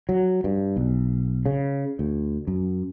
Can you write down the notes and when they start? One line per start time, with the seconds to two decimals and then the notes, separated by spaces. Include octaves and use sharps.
0.09 F#3
0.44 G2
0.76 B1
1.46 C#3
1.99 D2
2.47 F#2